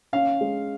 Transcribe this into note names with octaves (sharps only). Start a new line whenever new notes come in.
C#4 F5
G#3